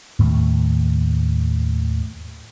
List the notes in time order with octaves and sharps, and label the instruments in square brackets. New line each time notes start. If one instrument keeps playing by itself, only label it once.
[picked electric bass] D#2 A2 D#3 A3